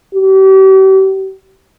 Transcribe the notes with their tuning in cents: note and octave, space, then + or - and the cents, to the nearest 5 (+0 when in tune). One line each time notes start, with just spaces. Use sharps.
G4 -40